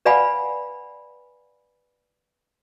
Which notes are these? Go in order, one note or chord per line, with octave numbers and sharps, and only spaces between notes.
B4 D5 F5 F#5 G#5 B5